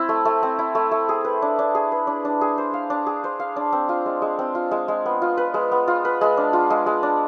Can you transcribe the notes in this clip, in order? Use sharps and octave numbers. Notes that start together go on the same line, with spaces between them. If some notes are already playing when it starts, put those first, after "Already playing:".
Already playing: C4 E4
A3
A3
C4
E4
A3
A3
G#4
B4
D4
D4
G#4
B4
D4
D4
G#4
C5
F5
D4
G#4
C5
F5
D4
C4
F4
G#3
G#3
C4
F4
G#3
G#3
B3
F4
B4
G#3
B3
F4
B4
G#3
D4
F4
G#3
G#3
D4